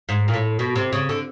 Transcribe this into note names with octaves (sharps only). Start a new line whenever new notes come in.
G#2
A#2
A2
B2
C3
C#3
D3